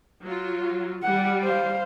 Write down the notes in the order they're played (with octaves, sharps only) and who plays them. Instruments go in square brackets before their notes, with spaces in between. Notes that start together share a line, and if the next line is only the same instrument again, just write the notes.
[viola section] F#3 F4
[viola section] G3 [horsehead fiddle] F#5
[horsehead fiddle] C5 F5